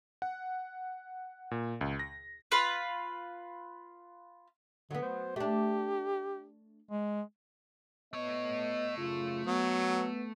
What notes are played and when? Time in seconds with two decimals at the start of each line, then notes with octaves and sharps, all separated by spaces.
0.22 F#5
1.51 A#2
1.81 C#2
1.99 A#6
2.52 F4 B4
4.91 D3 F#3 B3
5.02 C5
5.36 A3 D4 G4
6.91 G#3
8.13 A3 B3 C#5 D#5
8.97 F#2 C#3 F4
9.47 F#3 B3